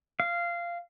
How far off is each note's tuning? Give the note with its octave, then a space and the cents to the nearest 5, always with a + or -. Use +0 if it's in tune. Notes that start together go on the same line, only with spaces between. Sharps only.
F5 -15